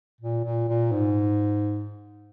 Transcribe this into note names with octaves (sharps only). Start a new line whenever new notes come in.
A#2
A#2
A#2
G#2